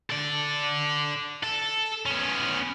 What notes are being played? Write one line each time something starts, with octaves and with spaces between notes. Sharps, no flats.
A4 D5
A4
B3 C#4